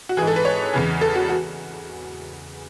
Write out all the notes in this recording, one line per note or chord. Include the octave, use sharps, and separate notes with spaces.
F#4
G#2 E3 G#4
A4
B4
C#5
E2 C#3 E3
A4
F#4
F#4